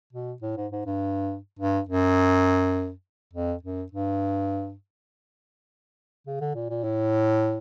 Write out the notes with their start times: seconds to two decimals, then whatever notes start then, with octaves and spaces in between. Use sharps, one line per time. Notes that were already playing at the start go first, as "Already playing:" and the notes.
0.13 B2
0.42 A2
0.57 G#2
0.72 G#2
0.86 G2
1.59 G2
1.89 F#2
3.33 F2
3.63 F#2
3.92 G2
6.27 C#3
6.41 D3
6.55 A#2
6.70 A#2
6.84 A2